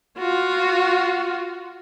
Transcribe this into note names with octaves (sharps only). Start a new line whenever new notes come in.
F4 F#4